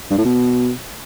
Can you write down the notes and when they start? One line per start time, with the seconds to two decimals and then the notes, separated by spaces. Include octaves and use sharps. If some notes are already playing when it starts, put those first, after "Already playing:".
0.10 G2
0.18 A2
0.25 B2